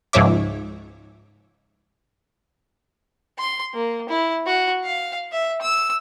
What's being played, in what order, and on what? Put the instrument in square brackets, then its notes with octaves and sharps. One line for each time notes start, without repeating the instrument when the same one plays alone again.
[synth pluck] C#2 G#2 F3 C#5 E5 D6
[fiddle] C6
A#3
E4
F#4
F5
E5
E6